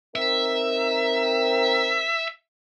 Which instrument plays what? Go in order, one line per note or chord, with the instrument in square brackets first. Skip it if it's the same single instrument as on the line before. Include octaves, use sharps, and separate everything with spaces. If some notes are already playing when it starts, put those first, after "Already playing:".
[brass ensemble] C4 D#4 A#4 [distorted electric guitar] E5